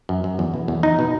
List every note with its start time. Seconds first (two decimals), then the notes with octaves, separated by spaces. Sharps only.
0.09 F#2
0.24 F#2
0.39 E2
0.54 B2
0.68 E2
0.83 E2 D#4
0.99 B2